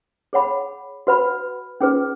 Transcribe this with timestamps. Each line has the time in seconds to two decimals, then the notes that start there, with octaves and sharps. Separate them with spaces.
0.33 G#4 C#5 F#5 B5
1.07 F#4 B4 F#5 B5
1.81 C#4 F4 G#4 B4